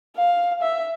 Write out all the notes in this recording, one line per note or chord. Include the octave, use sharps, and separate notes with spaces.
F5
E5